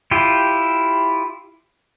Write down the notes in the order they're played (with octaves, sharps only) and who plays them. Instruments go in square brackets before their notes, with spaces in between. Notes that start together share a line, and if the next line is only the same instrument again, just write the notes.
[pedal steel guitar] E4 F4 G4